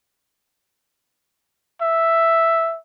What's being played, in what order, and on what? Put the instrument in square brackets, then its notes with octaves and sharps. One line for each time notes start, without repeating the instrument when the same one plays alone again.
[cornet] E5